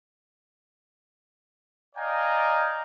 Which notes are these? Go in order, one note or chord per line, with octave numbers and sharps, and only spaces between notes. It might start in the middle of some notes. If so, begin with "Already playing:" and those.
D5 D#5 F5 G5 G#5 A#5